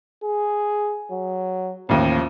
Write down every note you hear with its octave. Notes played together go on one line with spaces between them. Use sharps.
G#4
F#3
A1 D#2 F3